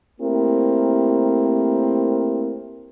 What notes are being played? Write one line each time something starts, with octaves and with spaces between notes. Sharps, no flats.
A3 A#3 C4 E4 G4 A#4